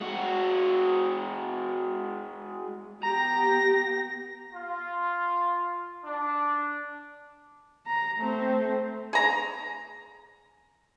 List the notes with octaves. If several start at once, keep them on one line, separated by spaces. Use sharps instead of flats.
G#3 F#4
B3 G4 A#5 A#6
F4
D4
A#5
A3 C4
G#4 A#5